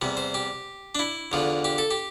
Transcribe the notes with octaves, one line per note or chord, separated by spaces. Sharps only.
E2 C3 G3
C5
G4
D4
E4
E2 D3 F3
G4
A4
G4